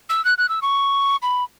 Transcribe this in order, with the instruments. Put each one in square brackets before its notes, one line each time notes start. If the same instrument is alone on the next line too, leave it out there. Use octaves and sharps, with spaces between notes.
[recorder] E6
F#6
F#6
E6
C#6
B5